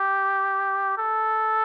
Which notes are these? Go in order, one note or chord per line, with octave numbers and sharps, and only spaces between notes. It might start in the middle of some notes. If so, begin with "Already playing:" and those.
Already playing: G4
A4